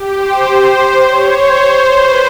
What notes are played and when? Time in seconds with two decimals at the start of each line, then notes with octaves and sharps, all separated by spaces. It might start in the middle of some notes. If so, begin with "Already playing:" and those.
Already playing: G4
0.17 C5
0.75 C5
1.04 C#5
1.33 C5
1.92 B4